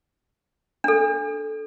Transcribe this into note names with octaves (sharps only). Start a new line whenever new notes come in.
D4 A4